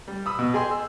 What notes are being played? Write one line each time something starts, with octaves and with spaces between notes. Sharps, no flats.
G3
B5 D#6 E6
B2
G#4 D#5 G5 G#5 C6
E6